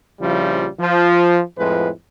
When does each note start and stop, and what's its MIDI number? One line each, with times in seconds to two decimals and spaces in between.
0.22 0.68 34
0.22 0.68 49
0.22 0.68 53
0.22 0.68 55
0.22 0.68 64
0.80 1.41 53
1.58 1.90 41
1.58 1.90 45
1.58 1.90 53
1.58 1.90 56
1.58 1.90 71